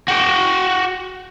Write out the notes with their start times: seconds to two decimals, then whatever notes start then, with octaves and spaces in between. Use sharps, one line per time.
0.08 F#4 G5